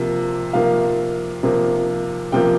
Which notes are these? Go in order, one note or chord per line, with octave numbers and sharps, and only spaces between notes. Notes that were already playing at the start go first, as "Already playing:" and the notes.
Already playing: C3 F3 A#3
C3 F3 A#3 F5
C3 F3 A#3
C3 F3 A#3 G5